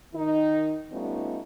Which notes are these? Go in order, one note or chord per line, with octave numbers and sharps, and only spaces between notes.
D#3 D#4
G3 A3 B3 C#4 D#4 F4